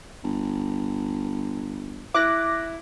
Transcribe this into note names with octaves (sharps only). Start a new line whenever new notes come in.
G1
E4 D6 F#6 A#6